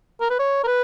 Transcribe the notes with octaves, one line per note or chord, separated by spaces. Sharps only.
A#4
B4
C#5
A#4
B4